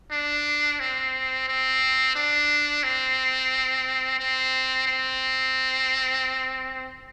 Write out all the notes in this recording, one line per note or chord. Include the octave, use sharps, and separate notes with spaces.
D4
C4
C4
D4
C4
C4
C4